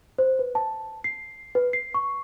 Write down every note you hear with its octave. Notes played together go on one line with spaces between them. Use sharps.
C5
B4
A5
C7
B4
C7
C#6